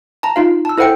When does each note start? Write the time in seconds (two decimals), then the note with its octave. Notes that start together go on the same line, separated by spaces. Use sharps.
0.23 A5 A#5
0.36 D#4 F4 F5
0.65 A5 E6
0.78 E4 A4 C5 F#5 G5 C#7